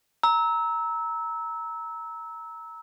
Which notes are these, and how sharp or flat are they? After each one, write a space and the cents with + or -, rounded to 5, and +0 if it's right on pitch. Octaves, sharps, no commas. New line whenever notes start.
A#5 +0 E6 -20